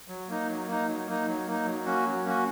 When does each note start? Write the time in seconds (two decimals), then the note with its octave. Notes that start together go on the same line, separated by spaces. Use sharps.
0.08 F#3
0.28 A#3 D#4
0.48 F#3
0.67 A#3 D#4
0.88 F#3
1.07 A#3 D#4
1.27 F#3
1.47 A#3 D#4
1.65 F#3
1.85 A#3 C#4 F#4
2.05 F#3
2.25 A#3 C#4 F#4